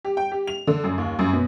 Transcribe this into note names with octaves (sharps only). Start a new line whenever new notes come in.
G4
G5
G4
F7
D3
F#2
D#2
F#2
B2